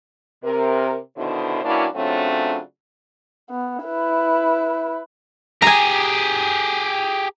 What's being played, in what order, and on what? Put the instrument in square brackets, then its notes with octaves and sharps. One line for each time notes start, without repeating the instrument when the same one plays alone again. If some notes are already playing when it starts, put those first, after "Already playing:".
[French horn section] C3 A#4
B2 D3 D#3 E4 C5
E3 A#3 C#4 D4 E4 F#4
C#3 F#3 A3 C4 D4 F4
[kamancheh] B3
E4 B4
[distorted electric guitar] G4 G#4 [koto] G#5 A#5